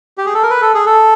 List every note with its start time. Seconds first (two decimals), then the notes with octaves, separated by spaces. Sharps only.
0.18 G4
0.26 G#4
0.34 A4
0.43 A#4
0.50 B4
0.61 A4
0.74 G#4
0.86 A4